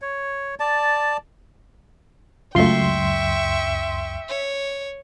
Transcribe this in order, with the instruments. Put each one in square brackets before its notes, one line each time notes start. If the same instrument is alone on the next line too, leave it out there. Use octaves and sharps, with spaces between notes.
[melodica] C#5
D5 A5
[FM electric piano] C#2 F#2 C6 [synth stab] A3 F4 [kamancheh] E5 [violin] G5 C#6
[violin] C#5